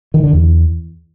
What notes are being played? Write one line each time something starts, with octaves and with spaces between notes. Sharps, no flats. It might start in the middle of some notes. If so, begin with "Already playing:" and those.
D#3
D3
E2